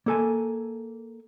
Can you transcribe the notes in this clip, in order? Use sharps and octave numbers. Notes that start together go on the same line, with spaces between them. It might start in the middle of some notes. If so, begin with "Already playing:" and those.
A#3 A4 G#5